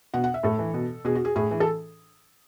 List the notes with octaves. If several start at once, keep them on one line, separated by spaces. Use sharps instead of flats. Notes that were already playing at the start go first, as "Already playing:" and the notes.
B2 F#5
F#5
E5
A2 A4
E3
B2
B2 G#4
F#4
G#4
A2 G#4
E3
A4